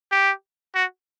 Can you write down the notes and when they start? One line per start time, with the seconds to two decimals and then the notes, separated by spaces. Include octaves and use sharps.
0.12 G4
0.75 F#4